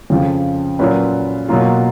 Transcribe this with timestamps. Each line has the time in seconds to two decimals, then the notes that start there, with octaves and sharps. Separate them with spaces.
0.10 F2 C#3 F3
0.79 A#2 F#3 C#4 F4 B4
1.49 B2 F#3 A#3 F4